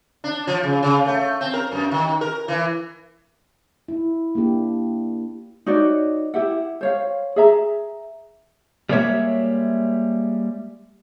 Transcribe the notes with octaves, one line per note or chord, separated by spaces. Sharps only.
D4
F3
C#3
C#3
A3
C4
A#4
F#2
D#3
A#4
E3
E4
A#3 D4 G4
D#4 F#4 C#5 D5
E4 G4 E5 F#5
C5 C#5 F5
G#4 E5 A#5
G3 G#3 A#3 B3 C#5 E5